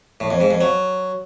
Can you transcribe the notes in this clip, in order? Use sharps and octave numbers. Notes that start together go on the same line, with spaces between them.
A2
F2
G#2
F2
F#3